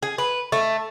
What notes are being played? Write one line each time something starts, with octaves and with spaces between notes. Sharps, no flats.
G#4
B4
A3